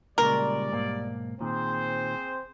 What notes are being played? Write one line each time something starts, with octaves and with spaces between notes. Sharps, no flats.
A#2 C#3 G3 G#3 A#4 D5
B1 G#2 A#3
A#2 D#3 C4 G#4 C5